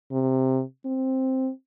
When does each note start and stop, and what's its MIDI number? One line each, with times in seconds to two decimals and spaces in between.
0.12 0.61 48
0.85 1.50 60